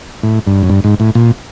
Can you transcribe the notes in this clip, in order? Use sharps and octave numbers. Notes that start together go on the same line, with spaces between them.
A2
G2
F#2
G2
G#2
A2
A#2